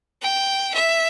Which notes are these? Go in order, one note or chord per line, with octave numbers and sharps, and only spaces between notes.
G5
E5